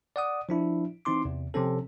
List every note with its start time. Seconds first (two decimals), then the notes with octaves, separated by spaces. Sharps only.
0.16 D5 F#5 D#6
0.49 F3 D4 E4
1.05 E3 C4 D#4 C6 D6
1.25 E2 C3
1.54 C3 F3 C4 C#4 A4